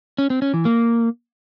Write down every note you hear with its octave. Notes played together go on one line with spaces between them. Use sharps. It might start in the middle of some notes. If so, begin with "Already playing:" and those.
C#4
C4
C#4
E3
A#3